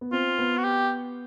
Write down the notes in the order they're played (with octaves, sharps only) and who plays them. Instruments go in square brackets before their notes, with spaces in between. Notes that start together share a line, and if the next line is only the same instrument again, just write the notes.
[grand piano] B3
[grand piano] C4 [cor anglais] F4
[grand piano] B3
[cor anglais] F#4
G4